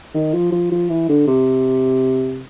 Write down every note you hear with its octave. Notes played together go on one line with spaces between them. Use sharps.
D#3
F3
F3
F3
E3
D3
C3